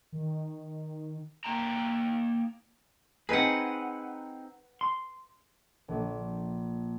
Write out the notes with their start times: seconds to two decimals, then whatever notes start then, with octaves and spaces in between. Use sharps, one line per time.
0.12 D#3
1.45 A#3 G5 A#5
3.29 C4 D#4 G#4 B4 F#5
4.81 C6
5.88 A#1